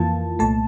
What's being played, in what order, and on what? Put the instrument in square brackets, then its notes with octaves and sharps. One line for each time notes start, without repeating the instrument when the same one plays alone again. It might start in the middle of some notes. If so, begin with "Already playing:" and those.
Already playing: [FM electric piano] F2 E3 A#3 F4 A5
C2 A#2 A3 A5